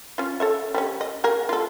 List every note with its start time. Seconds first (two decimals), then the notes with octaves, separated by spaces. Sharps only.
0.18 C#4 F4
0.40 A4 C#5 E5
0.74 G3 B3 C#4
1.01 D#5
1.24 A#3 G#4 A#4
1.49 F4 A4